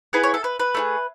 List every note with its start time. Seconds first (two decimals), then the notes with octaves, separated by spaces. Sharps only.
0.13 B3 E4 G#4 B4
0.24 C#5
0.34 A4
0.44 B4
0.60 B4
0.75 A3 D4 G#4